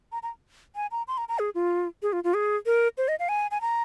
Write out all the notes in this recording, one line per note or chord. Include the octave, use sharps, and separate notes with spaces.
A#5
A#5
G#5
A#5
C6
A#5
A#5
G#4
F4
G#4
F4
F4
G#4
A#4
C5
D#5
F5
G#5
G#5
A#5